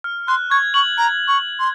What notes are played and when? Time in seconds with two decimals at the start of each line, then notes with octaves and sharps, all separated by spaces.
0.04 F6
0.28 C6 F#6
0.50 C#6 G#6
0.74 C#6 F#7
0.98 A#5
1.28 C#6
1.59 C6